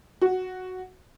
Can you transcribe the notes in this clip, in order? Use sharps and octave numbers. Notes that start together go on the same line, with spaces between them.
F#4